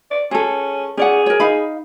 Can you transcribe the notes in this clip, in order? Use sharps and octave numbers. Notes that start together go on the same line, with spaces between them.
D5
C#4 G#4 A4
C#4 G#4 D5 F#5
A#4 C#5
D#4 F5 B5